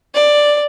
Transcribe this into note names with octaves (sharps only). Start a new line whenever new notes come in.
D5